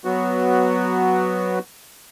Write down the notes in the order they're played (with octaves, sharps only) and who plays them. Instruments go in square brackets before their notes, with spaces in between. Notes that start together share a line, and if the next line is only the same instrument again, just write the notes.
[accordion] F#3 B3 F#4